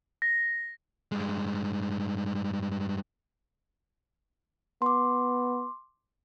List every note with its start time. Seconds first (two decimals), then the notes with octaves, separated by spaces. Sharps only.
0.22 A#6
1.12 G2 G#3
4.82 B3 C6 D6